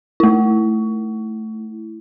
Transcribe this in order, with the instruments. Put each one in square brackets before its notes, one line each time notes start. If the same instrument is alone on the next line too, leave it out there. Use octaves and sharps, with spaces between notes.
[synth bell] A3 E4